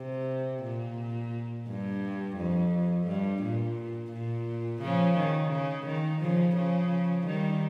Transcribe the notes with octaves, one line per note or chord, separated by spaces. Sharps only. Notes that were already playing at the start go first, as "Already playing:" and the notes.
Already playing: C3
A#2
G2
F2
G2
A#2
A#2
C#3 F3
D#3
C#3
D#3
C#3 F3
C#3 F3
D#3 G3